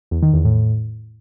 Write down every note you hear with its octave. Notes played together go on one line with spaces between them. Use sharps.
E2
D#3
E2
A2